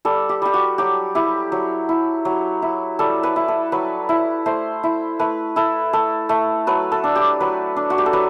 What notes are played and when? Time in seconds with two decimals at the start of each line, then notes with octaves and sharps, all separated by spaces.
0.05 G3 A4
0.29 G4
0.42 G3 G4
0.54 F#4
0.78 F#3 G4
1.15 E4 G4
1.52 F#3
1.89 E4
2.25 F#3
2.62 E4
2.99 G3 A4
3.23 B4
3.36 E4
3.48 A4
3.72 F#3 B4
4.09 E4
4.46 A3 C5
4.83 E4
5.19 A3 B4
5.56 E4 A4
5.93 A3 A4
6.29 A3
6.67 F#3 B4
6.92 A4
7.04 D4
7.15 G4
7.40 F#3 B4
7.76 D4
7.90 F#4
7.98 G4
8.06 A4
8.13 F#3 B4